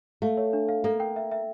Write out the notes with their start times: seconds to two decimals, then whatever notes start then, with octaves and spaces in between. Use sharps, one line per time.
0.22 A3 F5
0.37 C#5
0.53 D4
0.69 F5
0.84 A#3 A4
1.00 G5
1.16 E5
1.32 E5